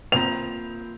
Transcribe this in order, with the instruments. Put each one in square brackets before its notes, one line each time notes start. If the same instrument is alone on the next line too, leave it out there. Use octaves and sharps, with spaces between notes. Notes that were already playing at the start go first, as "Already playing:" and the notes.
[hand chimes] A#3 F4 [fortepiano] C4 A#5 [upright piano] F7